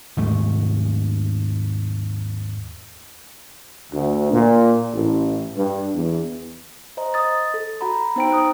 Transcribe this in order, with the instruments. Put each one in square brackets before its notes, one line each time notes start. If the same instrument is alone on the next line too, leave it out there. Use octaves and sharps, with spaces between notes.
[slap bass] D#2 G#2 A3
[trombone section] D2
A#2
A1
G2
E2
[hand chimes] C5 D#5 A#5
D#5 D#6 A6
A4
F#4 F#5 A#5 B5
B3 D#4 C5 G5 A#5 D7
C5 D#6 F#6